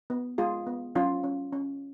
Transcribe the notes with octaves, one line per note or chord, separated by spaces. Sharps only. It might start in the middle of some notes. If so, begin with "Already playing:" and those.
B3
G#3 F4 G#4
B3
F#3 C#4 F4
C#4
C#4